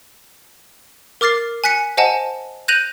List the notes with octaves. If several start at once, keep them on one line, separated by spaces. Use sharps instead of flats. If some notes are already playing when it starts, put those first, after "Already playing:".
A#4 D6 F6 A6 C7
G#5 F#6 B6 C#7
C5 D#5 F#5 G#5 A5
F#6 G6 A#6 D#7 F7 F#7